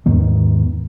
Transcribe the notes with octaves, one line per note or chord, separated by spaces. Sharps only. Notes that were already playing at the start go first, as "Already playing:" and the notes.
D#2 G#2 D#3 B3